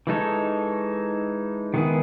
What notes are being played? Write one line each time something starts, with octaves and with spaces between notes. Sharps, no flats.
E3 G#3 D#4 A4 C#5
D#3 G#3 B3 E4 G#4